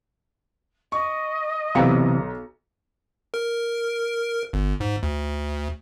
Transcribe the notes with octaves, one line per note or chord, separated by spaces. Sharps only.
D#5 C#6
B1 C3 E3 F5 G5 A#5 C#7
A#4
G1
G#2
D2